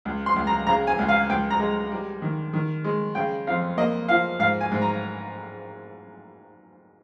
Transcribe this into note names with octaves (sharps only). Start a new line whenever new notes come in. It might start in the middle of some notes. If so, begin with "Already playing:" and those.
C#2
C6
C#2
A#5
C#3 A#5
G#5
C#2
F5
C#2 G5
A#5
G#3
G3
D#3
D#3
G#3
C#3 G5
F2 F5
A#3 D#5
F3 F5
G#2 F5
G#5
G#2
A#5